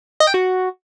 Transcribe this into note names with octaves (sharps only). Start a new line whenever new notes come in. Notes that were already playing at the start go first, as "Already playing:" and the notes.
D#5
G5
F#4